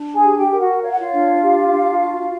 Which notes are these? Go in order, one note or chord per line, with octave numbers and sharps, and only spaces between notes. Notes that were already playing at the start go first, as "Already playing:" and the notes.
Already playing: D4
G#4 G#5
G4
G4 G5
A#4 G5
F#4 F#5
C#5 F5
F#5
F4 F5
D4
G4
D4
F#4